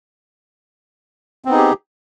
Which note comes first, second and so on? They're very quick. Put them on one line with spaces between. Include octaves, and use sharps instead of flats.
C4 B3 D#4 G#4 G4